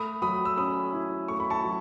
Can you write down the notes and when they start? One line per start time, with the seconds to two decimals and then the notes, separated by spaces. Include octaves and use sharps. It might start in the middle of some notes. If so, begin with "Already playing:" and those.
Already playing: A3 B5 D#6
0.22 F#3 B5 D#6
0.45 E6
0.57 C#4 B5 D#6
0.93 E4
1.28 A3 C#6
1.40 B5
1.50 A5 C#6
1.64 F#3